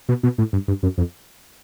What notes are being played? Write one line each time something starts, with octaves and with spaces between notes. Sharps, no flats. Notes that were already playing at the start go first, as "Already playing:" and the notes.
B2
B2
A2
G2
G2
F#2
F2